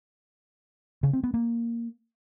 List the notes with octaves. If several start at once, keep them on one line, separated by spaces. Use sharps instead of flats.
C#3
C4
B3
A#3